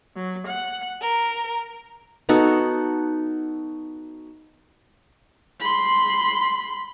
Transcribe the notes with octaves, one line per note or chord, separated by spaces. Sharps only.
F#3
F#5
A#4
B3 D#4 F#4 A4
B5 C6